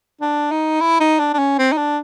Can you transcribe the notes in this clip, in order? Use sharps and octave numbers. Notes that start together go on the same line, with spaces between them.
D4
D#4
E4
D#4
D4
D4
C#4
C4
D#4
D4